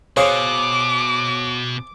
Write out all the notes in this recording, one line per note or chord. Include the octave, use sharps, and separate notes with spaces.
B2 G#4 C5 C#5 F5 D6